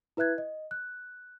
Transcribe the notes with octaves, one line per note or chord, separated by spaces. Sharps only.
E4 B4 E5 F#6 G#6
D#5
F#6